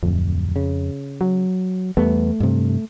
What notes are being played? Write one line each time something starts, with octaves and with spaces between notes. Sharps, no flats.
D1 F2
C#3
F#3
E2 G3 A3 B3
G2 C3